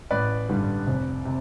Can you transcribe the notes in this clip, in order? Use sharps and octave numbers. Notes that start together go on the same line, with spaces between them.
A1 B4 D5
G2 D3 G3
F1
C3